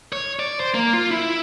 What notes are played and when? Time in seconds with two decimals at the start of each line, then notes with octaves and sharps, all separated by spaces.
0.13 C#5
0.39 D5
0.60 C5
0.74 A#3
0.93 F4
1.11 E4